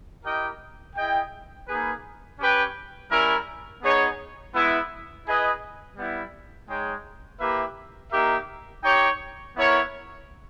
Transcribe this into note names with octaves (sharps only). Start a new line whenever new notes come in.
E4 G4 A#4 D#5 G5
E4 G#4 D#5 G5
A#3 D#4 G#4 B4
C#4 G4 B4 G5
G3 C#4 E4 A#4
B3 D#4 G#4 C#5
G#3 B3 E4
E4 G#4 B4 D#5
G3 B3 E4
G#3 D#4 G#4 C#5 G5
A#3 E4 G4 B4 E5
A#3 D#4 G4 A#4 E5
D#4 G4 C#5 G5
B3 E4 A#4 C#5